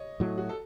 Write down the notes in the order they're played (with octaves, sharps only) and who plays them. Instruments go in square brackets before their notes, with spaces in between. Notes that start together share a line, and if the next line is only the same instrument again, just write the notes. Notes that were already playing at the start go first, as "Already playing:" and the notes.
Already playing: [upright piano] C#5 D#5
[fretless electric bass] A2 F#3 A3
[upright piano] F#4
A4